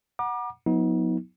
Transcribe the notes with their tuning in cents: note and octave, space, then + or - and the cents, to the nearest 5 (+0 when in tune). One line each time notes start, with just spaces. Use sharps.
F#5 +0 A#5 +45 D6 +30
F#3 -40 B3 -10 D#4 +40